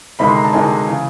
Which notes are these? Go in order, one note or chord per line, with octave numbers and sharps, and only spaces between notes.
D2 C3 D#3 G#3 B5
C6
A#5
A5
D2 C3 D#3 G#3 G#5
C#3 E3